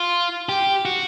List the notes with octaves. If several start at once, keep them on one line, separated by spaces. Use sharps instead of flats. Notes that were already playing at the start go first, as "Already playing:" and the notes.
Already playing: F4
G4
F#4